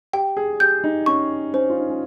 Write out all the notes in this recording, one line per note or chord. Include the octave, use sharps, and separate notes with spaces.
G4 G5
G#4
G4 G6
D#4
C#4 C#6
C#4 C5
F4
D#4
C#4